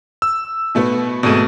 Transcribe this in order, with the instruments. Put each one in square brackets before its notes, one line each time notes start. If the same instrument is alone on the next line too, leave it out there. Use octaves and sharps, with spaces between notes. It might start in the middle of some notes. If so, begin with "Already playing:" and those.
[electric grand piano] E6
[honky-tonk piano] B2 A3 B3
[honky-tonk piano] G#1 G#3 D#7 [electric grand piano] B2 A3